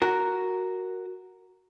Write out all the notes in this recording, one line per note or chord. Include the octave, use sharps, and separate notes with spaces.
F#4 A#4